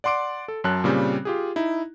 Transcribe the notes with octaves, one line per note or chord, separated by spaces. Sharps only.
D5 F#5 C6 D6 D7
A4
F#2 F#3 A5 F#6
A#2 C#3 G3 C4
F4 G4 G#4
D#4 E4